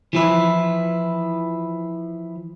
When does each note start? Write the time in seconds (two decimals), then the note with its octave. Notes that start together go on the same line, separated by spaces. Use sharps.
0.13 E3 F3 E4